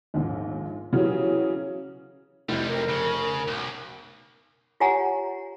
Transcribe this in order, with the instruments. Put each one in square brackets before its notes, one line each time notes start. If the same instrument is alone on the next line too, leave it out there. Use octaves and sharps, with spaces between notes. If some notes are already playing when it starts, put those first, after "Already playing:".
[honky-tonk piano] A#1 D#2 G#2
C#3 E3 F#3 C#4 G4
[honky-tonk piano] F1 G6 [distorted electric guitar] F2 G3 [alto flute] E4
[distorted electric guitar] F2 [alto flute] A#4
[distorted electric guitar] C#3
B1
[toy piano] F4 G4 C#5 F#5 G#5 A#5